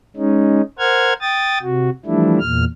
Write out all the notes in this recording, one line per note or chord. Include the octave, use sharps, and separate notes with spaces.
G#3 C#4 D#4
A#4 C5 F#5 F6 G#6
G5 D#6 A6
C3 F#4
E3 F3 G3 A3 D4 E4
E2 A#2 F6